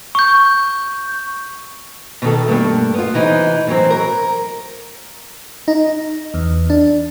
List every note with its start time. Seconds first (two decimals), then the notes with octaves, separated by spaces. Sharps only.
0.15 C#6 G6
2.22 B2 D#3 A4
2.48 G2 A3 A#3
2.94 B3 F4
3.14 C3 E3 D#4
3.67 A2 D3 E3 F#3 C4
3.90 A#4
5.68 D#4
6.34 E2
6.70 D4